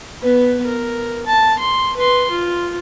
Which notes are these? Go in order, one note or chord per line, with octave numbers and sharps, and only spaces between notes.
B3 B4
A#4
A5
C6
B4 C6
F4